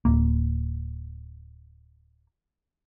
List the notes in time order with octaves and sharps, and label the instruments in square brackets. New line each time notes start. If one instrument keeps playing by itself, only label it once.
[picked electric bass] D1 A#3